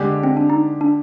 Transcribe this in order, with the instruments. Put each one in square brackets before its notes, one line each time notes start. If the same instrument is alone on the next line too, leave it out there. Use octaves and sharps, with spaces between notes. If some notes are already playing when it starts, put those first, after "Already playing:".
Already playing: [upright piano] D3 G#3 D4 G4
[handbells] C4
D4
D#4
D4